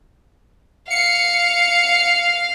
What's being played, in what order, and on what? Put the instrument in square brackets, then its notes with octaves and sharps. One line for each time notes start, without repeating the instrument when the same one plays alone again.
[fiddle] F5 [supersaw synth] C#7